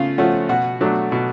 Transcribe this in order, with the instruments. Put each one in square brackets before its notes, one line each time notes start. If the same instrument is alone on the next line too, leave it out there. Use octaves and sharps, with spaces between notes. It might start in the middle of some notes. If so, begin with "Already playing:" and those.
Already playing: [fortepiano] C#3 A3 C#4 F4 F5
F3 A3 C#4 F#4 F#5
B2 F#4 F#5
F#3 A3 D4
B2